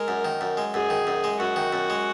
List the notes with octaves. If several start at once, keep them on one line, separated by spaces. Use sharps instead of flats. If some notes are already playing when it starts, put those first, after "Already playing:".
Already playing: G#3 A#4
F#2
D#3
F#2
G#3
F#2 G#4
D#3
F#2
G#3
F#2 F#4
D#3
F#2
G#3